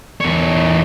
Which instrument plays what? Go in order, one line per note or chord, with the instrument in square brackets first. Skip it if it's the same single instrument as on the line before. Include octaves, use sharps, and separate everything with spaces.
[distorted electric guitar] E2 C#5